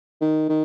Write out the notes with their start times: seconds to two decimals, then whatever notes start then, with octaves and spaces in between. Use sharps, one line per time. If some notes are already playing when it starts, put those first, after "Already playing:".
0.21 D#3
0.49 D#3